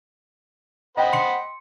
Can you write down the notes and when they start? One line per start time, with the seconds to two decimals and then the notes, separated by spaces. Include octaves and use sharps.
0.97 C5 D#5 F#5 G5 B5
1.13 C6 C#7